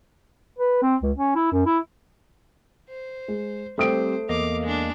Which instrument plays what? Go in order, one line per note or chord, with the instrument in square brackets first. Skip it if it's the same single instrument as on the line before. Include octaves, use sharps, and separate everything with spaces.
[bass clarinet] B4
C4
C#2
C#4
E4
F#2
E4
[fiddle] C5
[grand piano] G#3
[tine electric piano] G3 C4 G4 [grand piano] A3 D#6 D7 [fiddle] C5
[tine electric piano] E2 A#3 D#5 [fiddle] F5 D6
[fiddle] G#3 D4